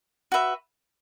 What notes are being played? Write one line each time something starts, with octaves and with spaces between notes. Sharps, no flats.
F#4 B4 E5